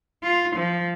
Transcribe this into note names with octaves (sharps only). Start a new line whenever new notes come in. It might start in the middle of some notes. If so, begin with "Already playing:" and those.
F4
F3